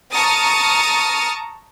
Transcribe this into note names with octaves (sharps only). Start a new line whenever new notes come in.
A5 A#5 C#6 D#6 F6 A6